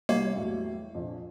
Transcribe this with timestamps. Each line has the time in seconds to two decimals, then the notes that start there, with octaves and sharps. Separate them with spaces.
0.09 C2 G3 A#3 C#5
0.36 E2 A2 F#3
0.95 A#1 F2